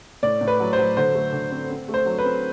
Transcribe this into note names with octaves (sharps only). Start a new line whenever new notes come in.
A2 D5
A2
B4
F#3
C5
F#3
D3 C5
A3
D3
C4
C4
A3
C5
F#3
B4
C4